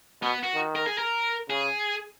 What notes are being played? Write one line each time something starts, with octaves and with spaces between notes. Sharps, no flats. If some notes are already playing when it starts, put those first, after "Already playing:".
B2 B3
F#4
D#3
A#4
G#4
A#4
C#3 G#4